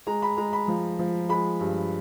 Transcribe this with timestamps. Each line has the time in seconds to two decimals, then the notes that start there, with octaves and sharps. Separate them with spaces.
0.07 G#3 A#5
0.22 B5
0.37 G#3 A#5
0.53 B5
0.68 F3
0.99 F3
1.29 G#3 B5
1.60 G2